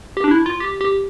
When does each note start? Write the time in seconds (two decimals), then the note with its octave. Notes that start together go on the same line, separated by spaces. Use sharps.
0.17 G4
0.24 D4
0.31 E4
0.46 F4
0.60 G4
0.81 G4